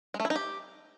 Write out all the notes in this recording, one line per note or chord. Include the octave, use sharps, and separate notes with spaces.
G#3
A3
E4
D#4
G4